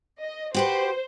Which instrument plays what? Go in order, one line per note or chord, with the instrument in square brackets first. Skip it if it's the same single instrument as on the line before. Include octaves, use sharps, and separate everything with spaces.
[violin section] D#5
[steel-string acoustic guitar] F#4 G4 B4 [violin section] C5